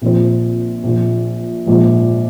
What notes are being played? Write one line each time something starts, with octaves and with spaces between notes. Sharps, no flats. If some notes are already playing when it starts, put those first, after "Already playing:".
A#1 A#2 F3 C4
A#1 A#2 F3
A#1 G#2 F3